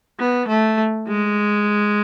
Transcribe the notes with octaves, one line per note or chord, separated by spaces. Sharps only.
B3
A3
G#3